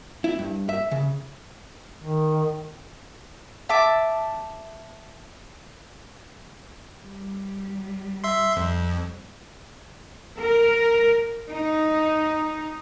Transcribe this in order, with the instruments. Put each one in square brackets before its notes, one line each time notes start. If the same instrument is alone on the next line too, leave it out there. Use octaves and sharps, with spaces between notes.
[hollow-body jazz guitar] E4
G2
E5
C#3
[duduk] D#3
[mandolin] E5 A5 D6
[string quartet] G3
[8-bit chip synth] E5 C6
F2
[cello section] A#4
D#4